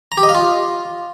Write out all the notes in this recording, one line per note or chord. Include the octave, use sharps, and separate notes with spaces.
A#5
G4
D#5
F5
F4